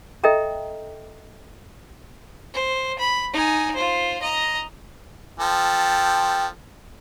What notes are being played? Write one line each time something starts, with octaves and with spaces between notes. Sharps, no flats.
A4 D#5 E5 G5 A#5
C5
B5
D#4 G#5
F4 C5
D#5 A#5
F3 A4 G5